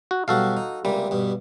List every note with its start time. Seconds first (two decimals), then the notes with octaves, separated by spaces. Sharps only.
0.11 F#4
0.28 B2 F#3 G3 F#4 A4 F5
0.57 D#4
0.85 C#2 C3 G3 A#3
1.11 G2 B2